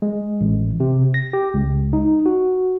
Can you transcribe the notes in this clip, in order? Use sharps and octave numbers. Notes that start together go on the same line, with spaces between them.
G#3
A1
C3
A#6
G4
C#2
D#4
F#4